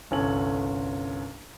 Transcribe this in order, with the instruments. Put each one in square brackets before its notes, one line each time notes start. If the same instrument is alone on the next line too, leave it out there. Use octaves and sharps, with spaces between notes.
[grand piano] G1 C2 C#4 A4 G#5 F#7